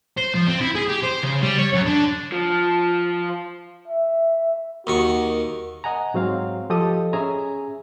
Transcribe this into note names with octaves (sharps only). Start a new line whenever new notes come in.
C5
F3
C4
E4
G#4
G4
C5
C#3
G3
C#5
F#2
D3
F3
E5
D#2 D#3 F#4 C#6
D#5 F#5 G#5 A#5
G#2 F#3 C4 F5
F3 G4 A4 D#5 D#6
C#4 G#4 E5 G#5 A#5